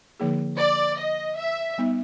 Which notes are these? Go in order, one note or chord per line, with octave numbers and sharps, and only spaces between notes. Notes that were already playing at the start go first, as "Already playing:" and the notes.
D3 F3 A#3 D#4 G#4
D5
D#5
E5
G3 B3 D#4